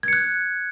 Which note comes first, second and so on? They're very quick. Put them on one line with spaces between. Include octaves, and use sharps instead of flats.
G#6 C#7 F#6